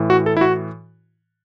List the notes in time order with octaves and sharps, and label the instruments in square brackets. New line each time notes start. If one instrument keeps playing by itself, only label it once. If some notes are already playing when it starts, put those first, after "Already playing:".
Already playing: [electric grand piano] A2 E3
F#4
A4
E4
F#4